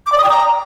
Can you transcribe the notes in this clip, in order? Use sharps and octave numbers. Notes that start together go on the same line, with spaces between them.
D6
D5
D#6
G5
A#5